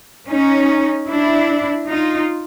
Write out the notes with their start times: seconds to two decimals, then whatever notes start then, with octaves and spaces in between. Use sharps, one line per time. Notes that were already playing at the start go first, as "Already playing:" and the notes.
0.29 C#4 D#4
1.09 D4 E4
1.90 D#4 F4